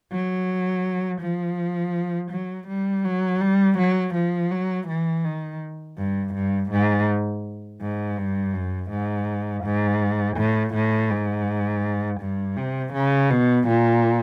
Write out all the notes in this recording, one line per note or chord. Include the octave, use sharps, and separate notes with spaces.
F#3
F3
F#3
G3
F#3
G3
F#3
F3
F#3
E3
D#3
G2
G2
G#2
G#2
G2
F#2
G#2
G#2
A2
A2
G#2
G2
C3
C#3
B2
A#2